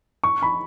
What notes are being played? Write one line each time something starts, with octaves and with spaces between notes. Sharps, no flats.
C#6
B5